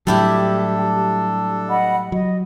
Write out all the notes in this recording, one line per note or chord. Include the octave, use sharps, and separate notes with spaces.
A2 F#3 G3 D4 E4 G4 A4
D#5 F#5 B5
F#3 D#5